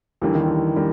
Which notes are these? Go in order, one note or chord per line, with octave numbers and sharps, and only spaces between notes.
D#2 D3 E3 G3 A#3
D#3
E3
D3 G3 A#3